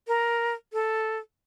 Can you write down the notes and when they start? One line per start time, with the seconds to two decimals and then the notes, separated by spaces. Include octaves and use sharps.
0.08 A#4
0.73 A4